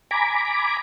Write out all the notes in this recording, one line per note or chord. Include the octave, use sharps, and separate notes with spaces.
G#5 A#5 B5 D6